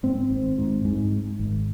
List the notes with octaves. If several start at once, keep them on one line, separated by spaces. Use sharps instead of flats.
G#2 C4
G#1
G#2
G#2
G#2
G#1